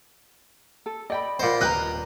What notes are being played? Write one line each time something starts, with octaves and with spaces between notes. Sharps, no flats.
A4
D5 D#5 G5 B5
A#2 C5 D#5 F#5 B5
D#1 A#4 B4 D#5 G5 A#5 F#6